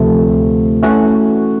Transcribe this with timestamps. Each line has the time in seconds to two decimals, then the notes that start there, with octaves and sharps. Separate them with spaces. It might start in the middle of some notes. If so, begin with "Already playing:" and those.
Already playing: D2 C3 F3 A3
0.82 E3 A3 C#4 F#4